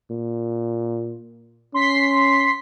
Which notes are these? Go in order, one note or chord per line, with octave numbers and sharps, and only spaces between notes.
A#2
C#4 C6 B6 C7